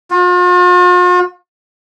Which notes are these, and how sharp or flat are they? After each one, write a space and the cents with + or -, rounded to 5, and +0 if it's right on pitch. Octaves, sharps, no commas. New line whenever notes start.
F4 +45